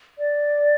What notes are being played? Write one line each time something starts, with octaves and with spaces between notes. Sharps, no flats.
D5